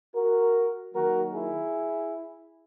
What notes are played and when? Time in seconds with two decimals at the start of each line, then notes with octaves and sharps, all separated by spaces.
0.14 F#4 A#4
0.94 D#3 F#3 A#3 F#4 A#4
1.34 E4 G#4